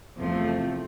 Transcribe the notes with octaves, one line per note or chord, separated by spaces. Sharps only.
E2 C3 F3 A3 C4